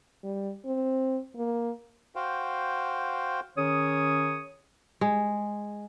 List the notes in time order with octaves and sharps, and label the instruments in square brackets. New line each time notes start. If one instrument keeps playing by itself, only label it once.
[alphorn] G3
C4
A#3
[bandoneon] F#4 C5 F5 G5
[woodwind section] D#3 C#4 G#4 C#5 D#6
[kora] G#3